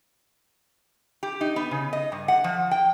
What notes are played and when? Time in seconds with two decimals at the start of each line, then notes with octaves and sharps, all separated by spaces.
1.23 G4
1.41 D#4
1.56 B3
1.71 C#3
1.93 D#5
2.12 G2
2.28 F#5
2.44 F3
2.71 G5